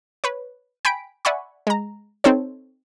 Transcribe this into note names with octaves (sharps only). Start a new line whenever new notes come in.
B4 C#5
G5 G#5 B5 B6 D7
D5 E5 F#5 G#5 B5 C#6
G#3 A#5
C4 D#4 A4 C5 C#5